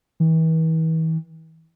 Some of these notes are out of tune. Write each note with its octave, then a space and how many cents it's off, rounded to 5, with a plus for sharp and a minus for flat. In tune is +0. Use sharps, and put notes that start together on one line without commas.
E3 -40